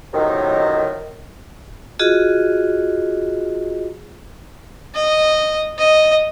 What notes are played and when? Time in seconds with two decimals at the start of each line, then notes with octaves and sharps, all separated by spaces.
0.13 F#2 A2 C3 D#3
1.99 F4 F#4 G#4 D#5
4.95 D#5
5.78 D#5